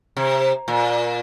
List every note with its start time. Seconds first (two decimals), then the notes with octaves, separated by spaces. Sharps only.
0.17 C3
0.68 A#2